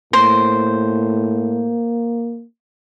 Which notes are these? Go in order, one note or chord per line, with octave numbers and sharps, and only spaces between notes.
A2 A#3 C5